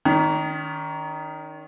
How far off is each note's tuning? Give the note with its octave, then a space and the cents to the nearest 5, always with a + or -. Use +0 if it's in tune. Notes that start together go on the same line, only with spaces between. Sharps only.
D#3 +0 C#4 +45